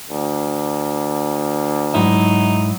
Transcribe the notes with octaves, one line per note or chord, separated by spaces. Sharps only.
D2
G#2 F#3 D#4 E4 E5